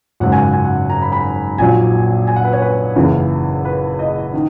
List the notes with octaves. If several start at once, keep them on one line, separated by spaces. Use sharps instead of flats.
G#1 F#2 C#3 F#3 F#5
G#5
F#5
G#5
F#5
A#5
B5
B5
A#1 A#2 F#3 G#5
G#5
F#5
B4
C#5
B4
F#1 E2 C#3 E3 B4
B4
D#5
D#3